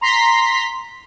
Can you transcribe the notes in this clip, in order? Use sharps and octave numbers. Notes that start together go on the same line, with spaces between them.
A#5 C6 B6